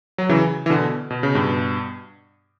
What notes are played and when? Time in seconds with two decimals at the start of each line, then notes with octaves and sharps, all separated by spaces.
0.18 F#3
0.29 C#3 E3
0.66 E3
0.70 B2 D3
1.10 B2
1.23 C#3
1.35 G2 B2